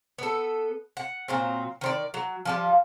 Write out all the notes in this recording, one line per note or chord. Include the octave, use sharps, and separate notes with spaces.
B3 A4
F#5
A#2 F#3 C4
D#3 C5 D5
F#3
F3 G3 F4